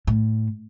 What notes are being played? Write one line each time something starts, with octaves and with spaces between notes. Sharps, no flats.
A2